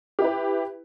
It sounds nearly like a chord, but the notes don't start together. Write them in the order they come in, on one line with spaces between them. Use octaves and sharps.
G4 E4 B4